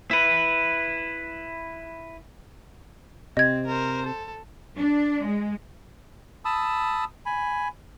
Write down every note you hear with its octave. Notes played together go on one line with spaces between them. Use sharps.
E4 B4
C3 C4 D#5 G#6
A#4 C5
A4
D4
G#3
A5 B5 D#6 E6
G#5 B5